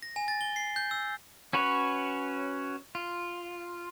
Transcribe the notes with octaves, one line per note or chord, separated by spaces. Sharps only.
A#6
G#5
A6
G7
C7
G6
E6
C#4 F#4 B4 C#5
F4